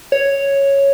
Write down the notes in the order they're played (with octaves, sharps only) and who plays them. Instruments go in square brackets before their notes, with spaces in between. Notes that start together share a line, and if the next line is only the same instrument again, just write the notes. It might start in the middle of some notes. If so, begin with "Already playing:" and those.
[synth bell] C#5